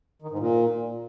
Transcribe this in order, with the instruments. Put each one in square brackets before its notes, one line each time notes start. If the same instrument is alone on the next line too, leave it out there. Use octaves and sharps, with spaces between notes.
[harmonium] D#3
G#2
A#2